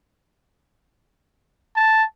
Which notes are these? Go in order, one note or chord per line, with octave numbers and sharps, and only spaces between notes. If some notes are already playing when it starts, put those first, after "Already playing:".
A5